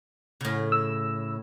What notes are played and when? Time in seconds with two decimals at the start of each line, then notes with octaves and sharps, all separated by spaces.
0.41 A2 C#3
0.72 E6